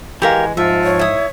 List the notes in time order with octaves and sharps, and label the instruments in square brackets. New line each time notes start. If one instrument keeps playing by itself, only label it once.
[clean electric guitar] E3 G#3 [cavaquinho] G4 A#4 F5
[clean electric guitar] G#2 [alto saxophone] F3 [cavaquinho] E5
[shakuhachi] C#5
[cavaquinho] E4 D#6